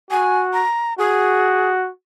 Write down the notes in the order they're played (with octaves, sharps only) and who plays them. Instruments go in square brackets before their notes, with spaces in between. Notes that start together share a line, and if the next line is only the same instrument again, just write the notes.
[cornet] F#4 [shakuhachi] G#5
[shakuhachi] A#5
[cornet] F#4 [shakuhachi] G#4